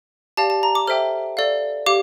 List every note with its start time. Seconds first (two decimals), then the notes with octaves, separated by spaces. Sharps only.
0.37 G4 D5 F5 A5
0.50 A5
0.63 A#5
0.75 D6
0.87 A4 C5 E5 G5 F6
1.37 A4 D5 F5
1.86 G4 F5 D6